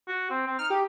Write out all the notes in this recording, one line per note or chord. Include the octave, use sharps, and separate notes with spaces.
F#4
C4
C4
D#4 F6
G4